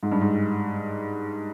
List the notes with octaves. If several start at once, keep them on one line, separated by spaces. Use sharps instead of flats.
G#2
G2
G#2